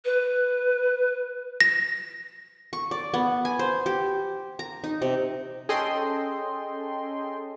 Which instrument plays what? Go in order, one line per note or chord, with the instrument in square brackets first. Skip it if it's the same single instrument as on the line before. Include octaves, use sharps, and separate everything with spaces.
[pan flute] B4
[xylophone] A#6
[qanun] C#6
D5
B3
G#5
C5
G4
A#5
D#4
C3
[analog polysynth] C#4 G#4 A4 D#5 G5 C6